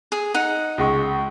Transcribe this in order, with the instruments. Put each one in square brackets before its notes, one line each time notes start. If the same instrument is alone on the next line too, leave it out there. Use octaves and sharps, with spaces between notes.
[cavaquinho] G#4
D#4 F#5
[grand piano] C#2 G#3 C#6